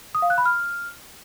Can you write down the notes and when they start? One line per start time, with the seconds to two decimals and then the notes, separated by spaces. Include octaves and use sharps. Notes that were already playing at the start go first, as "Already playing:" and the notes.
0.15 D#6
0.22 F5
0.30 F#6
0.38 B5
0.46 F6